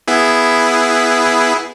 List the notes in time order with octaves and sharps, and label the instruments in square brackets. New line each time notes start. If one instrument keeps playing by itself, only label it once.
[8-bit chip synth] B3 E4 G#4